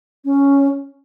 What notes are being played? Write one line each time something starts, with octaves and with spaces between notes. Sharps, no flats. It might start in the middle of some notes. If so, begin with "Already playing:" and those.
C#4